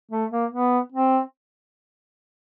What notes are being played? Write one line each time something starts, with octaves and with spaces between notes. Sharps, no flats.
A3
A#3
B3
C4